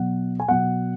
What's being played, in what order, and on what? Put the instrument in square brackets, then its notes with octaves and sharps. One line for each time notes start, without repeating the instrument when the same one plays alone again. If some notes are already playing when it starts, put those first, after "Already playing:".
Already playing: [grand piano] B2 F#3 F#5
G#5
B2 F#3 F#5